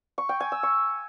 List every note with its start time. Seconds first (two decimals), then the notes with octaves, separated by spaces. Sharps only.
0.18 C#6
0.29 G5
0.40 G#5
0.52 E6
0.63 C#6